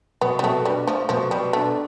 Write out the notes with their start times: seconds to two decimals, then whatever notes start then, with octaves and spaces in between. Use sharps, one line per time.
0.21 B2 B3
0.39 G3
0.43 B2 A3
0.65 G3 D4
0.87 F3 A3
1.09 B2 F3
1.31 B2 G3
1.53 A3 D4